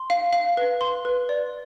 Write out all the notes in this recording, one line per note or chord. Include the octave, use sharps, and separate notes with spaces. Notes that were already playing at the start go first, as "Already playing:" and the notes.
Already playing: C6
F5
F5
B4
C6
B4
D5